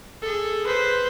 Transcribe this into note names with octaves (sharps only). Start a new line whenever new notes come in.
G#4 A4
B4 C5